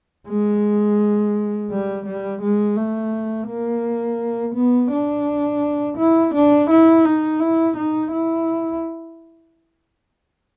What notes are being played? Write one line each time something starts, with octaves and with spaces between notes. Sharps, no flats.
G#3
G3
G3
G#3
A3
A#3
B3
D4
E4
D4
E4
D#4
E4
D#4
E4